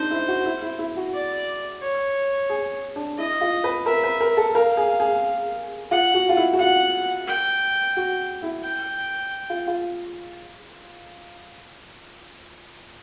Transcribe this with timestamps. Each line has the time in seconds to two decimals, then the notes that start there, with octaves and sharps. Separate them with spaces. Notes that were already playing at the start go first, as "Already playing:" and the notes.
Already playing: C4 D4 D#4 C5
0.11 E4
0.28 F#4
0.45 E4
0.62 E4
0.79 E4
0.97 F#4
1.14 D5
1.82 C#5
2.49 G#4
2.96 D4
3.18 E4 D#5
3.41 F4
3.64 B4
3.86 A#4 E5
4.04 B4
4.21 A#4
4.37 A4
4.54 A#4 F5
4.77 G#4
5.00 G#4
5.91 F4 F#5
6.14 F#4
6.29 F4
6.37 E4
6.53 F#4
6.59 F4 F#5
7.28 G5
7.97 F#4
8.42 E4
8.64 G5
9.50 F4
9.68 F4